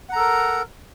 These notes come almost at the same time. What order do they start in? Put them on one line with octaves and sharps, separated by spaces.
F#5 A#5 A4 A#4